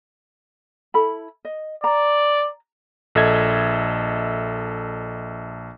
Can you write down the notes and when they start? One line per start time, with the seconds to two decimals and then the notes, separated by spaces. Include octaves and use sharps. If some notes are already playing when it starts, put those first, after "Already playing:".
0.94 E4 A4 B5
1.45 D#5
1.84 D5 A#5
3.15 A#1 A4 D#5 E5 G#6